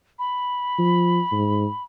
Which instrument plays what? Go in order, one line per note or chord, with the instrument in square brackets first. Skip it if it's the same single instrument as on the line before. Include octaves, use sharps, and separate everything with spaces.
[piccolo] B5
[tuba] F3
G#2